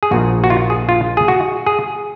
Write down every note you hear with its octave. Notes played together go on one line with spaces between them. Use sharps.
G#4
A#1 A#2 F3 F#4
F#4
F4
G#4
F4
G#4
F#4
G#4